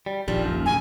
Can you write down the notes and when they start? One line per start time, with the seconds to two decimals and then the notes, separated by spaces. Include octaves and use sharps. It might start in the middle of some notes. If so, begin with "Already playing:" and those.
0.06 G3
0.28 D#1 A#1 D#2 F3 G3
0.45 F#2
0.66 F#2 A2 C#3 G#5